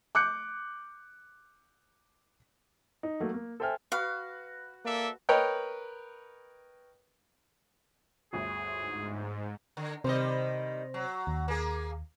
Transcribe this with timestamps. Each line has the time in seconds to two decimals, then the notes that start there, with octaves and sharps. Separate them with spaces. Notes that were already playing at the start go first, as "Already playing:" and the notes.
0.15 D6 F#6 G6 C#7
3.03 D#4
3.20 F#3 A3 A#3
3.34 A#3
3.60 A4 C5 E5 G5 G#5 F6
3.92 F#4 B4 F5
4.85 A#3 A4 D5 E5
5.29 A#4 B4 C#5 D#5 G5
8.33 G1 D2 G#4
8.78 G#2
9.77 D3
10.04 C3 D#3 G3 C5 D#5
10.94 F#3
11.27 D#2
11.48 A#3 G#4